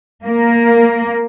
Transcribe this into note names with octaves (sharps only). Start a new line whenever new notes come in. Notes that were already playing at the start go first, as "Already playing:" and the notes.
A#3